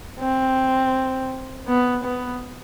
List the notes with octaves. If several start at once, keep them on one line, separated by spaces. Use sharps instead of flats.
C4
B3
B3